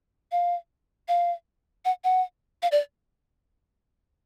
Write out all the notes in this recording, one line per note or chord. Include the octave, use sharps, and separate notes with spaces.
F5
F5
F#5
F#5
F5
D5